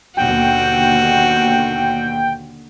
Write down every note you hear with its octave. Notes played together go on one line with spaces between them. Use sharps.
D#2 B2 D3 F#4 G5